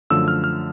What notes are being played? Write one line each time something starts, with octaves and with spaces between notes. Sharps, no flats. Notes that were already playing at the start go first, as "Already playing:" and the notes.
F#2 D3 F3 A3 E6
F6
F6